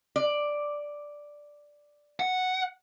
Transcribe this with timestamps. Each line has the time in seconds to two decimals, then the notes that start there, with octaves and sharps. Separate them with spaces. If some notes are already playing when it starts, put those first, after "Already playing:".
0.16 D5
2.20 F#5